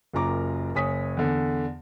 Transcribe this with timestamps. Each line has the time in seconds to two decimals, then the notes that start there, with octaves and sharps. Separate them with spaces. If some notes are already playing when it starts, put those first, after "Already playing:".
0.14 F#1 F#2 F4 A#5 D6
0.75 F#1 C#5 G#5 D#6 B6
1.17 E2 D3